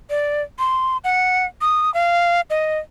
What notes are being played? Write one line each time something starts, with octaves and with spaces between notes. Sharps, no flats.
D5
C6
F#5
D#6
F5
D#5